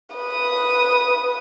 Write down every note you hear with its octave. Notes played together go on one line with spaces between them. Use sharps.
B4 D#6